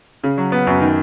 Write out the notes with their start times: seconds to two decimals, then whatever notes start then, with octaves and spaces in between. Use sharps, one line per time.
0.24 C#3
0.38 F#3
0.52 B3
0.67 F#2
0.81 D#3